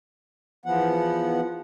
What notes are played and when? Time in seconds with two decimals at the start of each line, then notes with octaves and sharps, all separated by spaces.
0.65 E2 F3 B3 F#5